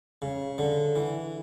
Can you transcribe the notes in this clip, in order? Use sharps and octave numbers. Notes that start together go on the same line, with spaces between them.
C#3
D3
E3